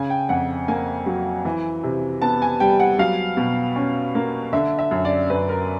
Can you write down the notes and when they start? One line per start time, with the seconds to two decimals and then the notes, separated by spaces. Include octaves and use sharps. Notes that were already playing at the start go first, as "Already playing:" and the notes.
Already playing: C#3 G#5
0.10 G5
0.29 F2 F#5
0.68 A#3 G#5
1.06 F#3
1.45 E3
1.83 C3
2.22 B3 A5
2.42 G#5
2.60 G3 G5
2.80 F#5
2.98 F#3 F5
3.37 B2
3.76 C#4
4.15 A#3
4.53 D3 E5
4.79 E5
4.91 F#2
5.05 D5
5.30 F#2 B4
5.49 A#4